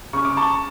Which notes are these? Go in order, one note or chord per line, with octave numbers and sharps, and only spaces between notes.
C#3 C#6
D6
A5 C#6